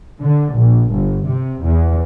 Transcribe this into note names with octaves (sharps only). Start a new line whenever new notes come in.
D3
A#1
G1
C3
E2